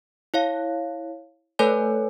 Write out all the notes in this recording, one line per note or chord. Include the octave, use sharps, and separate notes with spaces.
E4 C#5 F5
A3 A4 B4 C#5 G#5 G6